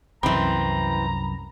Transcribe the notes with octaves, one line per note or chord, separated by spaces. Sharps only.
C2 F#2 E3 C4 A#5 B5